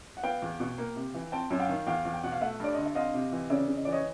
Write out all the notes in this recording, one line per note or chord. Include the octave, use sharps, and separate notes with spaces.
F#5
B3 F5 G5
E2
B2
A#3
C3
E3
C4 G5 A5
F#2
F5 G5
D#3
E2 F5 G5
E2
G5
B2 F#5
F5
A3 E5 F#5
G2 D5
D3 D#5
E5
C4 D#5 F5
C3
E3
C#3 D5 E5
C#3
D#5
E3 D5
C#5 D#5